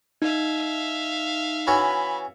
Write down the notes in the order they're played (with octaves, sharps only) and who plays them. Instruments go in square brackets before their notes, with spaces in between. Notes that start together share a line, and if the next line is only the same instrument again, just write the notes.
[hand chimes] D#4 [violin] E5 F5
[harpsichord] E3 C#4 F#4 [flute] B5